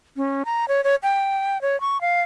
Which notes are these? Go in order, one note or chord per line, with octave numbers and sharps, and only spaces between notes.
C#4
A#5
C#5
C#5
G5
C#5
C#6
F5